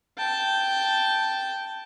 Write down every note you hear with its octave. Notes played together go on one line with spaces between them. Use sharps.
G5 A5